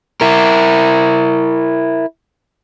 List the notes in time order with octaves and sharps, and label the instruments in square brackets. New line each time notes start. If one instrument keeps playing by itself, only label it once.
[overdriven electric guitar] E4 A#4